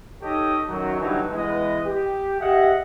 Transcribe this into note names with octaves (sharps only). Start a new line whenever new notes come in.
D#4 G4 A4 C#5 D#5
F#2 D#3 F#3
G2 D3 E3 F#3 D#4
E3 G#3 B3 B4 D#5
G4
G4 G#4 D#5 E5 F#5